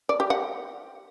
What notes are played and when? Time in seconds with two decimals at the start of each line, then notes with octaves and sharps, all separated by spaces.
0.09 D5
0.20 G4
0.30 F#5